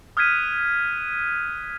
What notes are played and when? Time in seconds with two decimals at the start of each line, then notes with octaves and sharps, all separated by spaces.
0.17 D#6 F6 F#6 G#6 B6 D#7